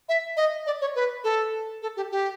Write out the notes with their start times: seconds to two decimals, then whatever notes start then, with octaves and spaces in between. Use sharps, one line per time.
0.09 E5
0.37 D#5
0.66 D5
0.81 C#5
0.95 B4
1.24 A4
1.82 A4
1.97 G4
2.11 G4